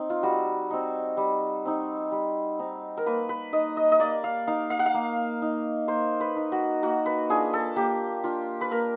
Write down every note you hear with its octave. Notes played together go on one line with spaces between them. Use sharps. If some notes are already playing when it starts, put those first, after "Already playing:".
Already playing: C4 D#4
F4
G3 F#4
C4 D#4
G3
C4 D#4
G3
C4 D#4
A#4
A#3 B4
B4
D#4 D#5
D#5
D#5
A#3 D5
F5
D#4 F5
F5
F#5
F5
A#3
D#4
A#3 C5
B4
D#4
F#4
A#3 F#4
B4
D4 F4 G#4
A4
A#3 G4
D4 F4
B4
A#3 A#4